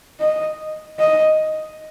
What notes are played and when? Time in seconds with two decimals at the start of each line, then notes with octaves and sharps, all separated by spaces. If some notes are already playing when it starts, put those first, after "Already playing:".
0.20 D#5
0.99 D#5